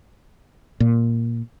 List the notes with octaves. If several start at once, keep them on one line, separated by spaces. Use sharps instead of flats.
A#2